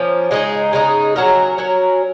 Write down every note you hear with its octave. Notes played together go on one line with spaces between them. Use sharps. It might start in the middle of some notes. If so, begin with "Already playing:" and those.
Already playing: F3 A#3 C#4
C#3 G#3 D#4 G#4
C#3 G#3 D#4 G#4
F#3 C#4 F#4 A#4
F#3 C#4 F#4 A#4